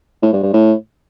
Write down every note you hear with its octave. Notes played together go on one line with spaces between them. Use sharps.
A2
G2
G2
A2